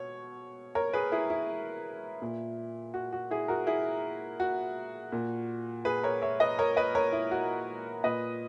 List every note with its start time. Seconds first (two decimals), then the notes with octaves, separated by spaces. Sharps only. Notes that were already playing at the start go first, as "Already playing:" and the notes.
Already playing: B2 C#5
0.75 A#4 C#5
0.93 G#4 B4
1.12 E4 G#4
1.30 E4
2.22 A#2
2.94 F#4
3.13 F#4
3.31 E4 G#4
3.48 F#4 A#4
3.67 E4 G#4
4.40 F#4
5.12 A#2
5.85 G#4 B4
6.03 A#4 C#5
6.22 C#5 E5
6.40 B4 D#5
6.59 A#4 C#5
6.77 B4 D#5
6.95 A#4 C#5
7.12 E4
7.31 F#4
8.04 A#2 B4 D#5